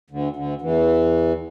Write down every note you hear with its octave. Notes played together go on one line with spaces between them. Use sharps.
D2 D3
D2 D3
E2 E3